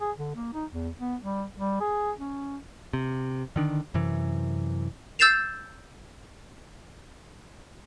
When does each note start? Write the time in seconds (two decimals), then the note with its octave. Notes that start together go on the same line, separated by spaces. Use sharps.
0.01 G#4
0.18 D3
0.35 A#3
0.53 D#4
0.71 E2
0.98 B3
1.21 G3
1.57 G3
1.80 G#4
2.18 C#4
2.93 C3
3.56 D3 D#3 D4
3.94 F#2 C3 E3
5.19 E6 G6 A6 C7 E7 F7